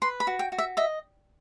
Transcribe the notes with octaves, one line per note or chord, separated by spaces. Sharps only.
B4 C6
B5
F#4
G5
F#4
E5
D#5 E5